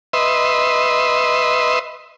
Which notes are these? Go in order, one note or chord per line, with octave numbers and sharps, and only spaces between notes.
B4 D#5 E5 C6